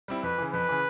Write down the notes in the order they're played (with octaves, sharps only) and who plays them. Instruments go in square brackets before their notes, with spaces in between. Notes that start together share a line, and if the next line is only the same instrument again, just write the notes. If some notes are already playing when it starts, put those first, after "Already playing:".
[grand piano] G3 C4 E4
[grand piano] F2 [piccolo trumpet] B4
[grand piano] C#3 E3
[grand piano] F2 [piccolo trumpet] B4
[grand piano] C#3 E3